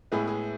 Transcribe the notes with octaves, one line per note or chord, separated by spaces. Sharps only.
A2 G#3 B3 E4 G#4 B4
G#4